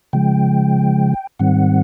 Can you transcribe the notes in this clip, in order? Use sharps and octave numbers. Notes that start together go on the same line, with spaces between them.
C#3 F3 G#3 G5
G#2 D#3 G3 C4 F#5